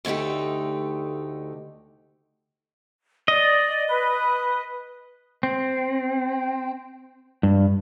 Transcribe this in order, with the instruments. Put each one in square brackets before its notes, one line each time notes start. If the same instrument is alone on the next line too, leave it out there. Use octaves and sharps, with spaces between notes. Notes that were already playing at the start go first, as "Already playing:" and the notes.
[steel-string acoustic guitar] D2 D3 A3 D#4 G4
[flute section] D5 [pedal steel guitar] D#5
[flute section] B4
[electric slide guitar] C4
G2